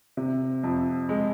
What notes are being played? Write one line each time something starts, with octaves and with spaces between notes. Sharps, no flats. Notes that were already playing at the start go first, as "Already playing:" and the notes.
C3
F2
G#3